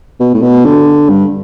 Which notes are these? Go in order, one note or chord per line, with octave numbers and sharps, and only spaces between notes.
B2
A2
B2
D3
G2